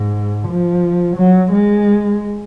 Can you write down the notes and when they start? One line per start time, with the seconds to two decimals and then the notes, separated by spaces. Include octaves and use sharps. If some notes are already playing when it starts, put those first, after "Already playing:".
Already playing: G#2
0.48 F3
1.17 F#3
1.52 G#3